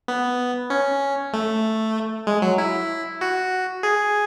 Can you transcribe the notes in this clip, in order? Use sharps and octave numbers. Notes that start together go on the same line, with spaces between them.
B3
C#4
A3
G#3
F#3
E4
F#4
G#4